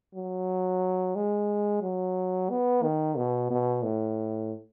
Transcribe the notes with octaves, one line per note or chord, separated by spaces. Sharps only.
F#3
G#3
F#3
B3
D#3
B2
B2
A2